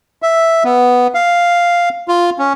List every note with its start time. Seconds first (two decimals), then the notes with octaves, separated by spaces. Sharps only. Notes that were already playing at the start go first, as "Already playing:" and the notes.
0.22 E5
0.64 B3
1.14 F5
2.08 F4
2.39 C#4